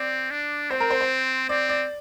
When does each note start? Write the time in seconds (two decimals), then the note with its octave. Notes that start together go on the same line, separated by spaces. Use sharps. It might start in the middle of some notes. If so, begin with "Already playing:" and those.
Already playing: C4 D5
0.31 D4
0.70 C4 C5
0.80 A#4
0.90 C5
1.01 C5
1.49 C4 D5
1.69 D5